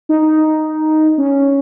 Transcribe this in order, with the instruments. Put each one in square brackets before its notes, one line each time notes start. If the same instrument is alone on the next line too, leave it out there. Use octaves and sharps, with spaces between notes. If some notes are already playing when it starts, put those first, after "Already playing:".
[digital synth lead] D#4
C#4